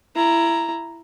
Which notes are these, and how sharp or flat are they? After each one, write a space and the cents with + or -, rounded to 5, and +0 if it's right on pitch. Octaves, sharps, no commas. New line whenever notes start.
E4 +20 A#5 +0